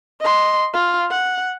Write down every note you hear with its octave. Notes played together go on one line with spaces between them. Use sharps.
D#5 C6
F4
F#5